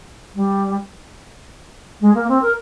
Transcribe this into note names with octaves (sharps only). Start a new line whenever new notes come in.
G3
G#3
A#3
C4
A#4